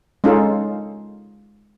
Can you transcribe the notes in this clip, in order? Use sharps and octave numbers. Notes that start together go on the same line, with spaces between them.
G#3 C#4 D#4 F4 A4